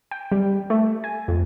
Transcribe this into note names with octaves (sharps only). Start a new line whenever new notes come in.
G5
G3
A3
G#5
F2